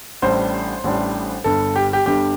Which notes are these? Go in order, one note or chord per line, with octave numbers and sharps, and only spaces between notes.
A1 A2 G3 D4 C5
A1 A2 G3 D4
G1 G2 D3 A4
G4
G4
G1 G2 D3 G4